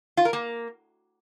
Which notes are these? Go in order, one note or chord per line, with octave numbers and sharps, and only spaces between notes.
F4
A#4
A#3